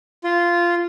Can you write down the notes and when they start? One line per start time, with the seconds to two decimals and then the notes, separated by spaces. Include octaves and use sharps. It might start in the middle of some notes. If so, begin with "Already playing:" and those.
0.24 F4